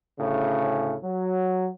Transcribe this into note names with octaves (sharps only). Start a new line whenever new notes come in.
D2 A2 C#3
F#3